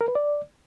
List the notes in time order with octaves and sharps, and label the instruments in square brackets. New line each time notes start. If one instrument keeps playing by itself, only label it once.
[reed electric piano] A#4
B4
D5